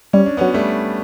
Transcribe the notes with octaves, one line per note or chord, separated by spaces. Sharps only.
G3 C#4
D4
B3 C#4
F#3
G3 A3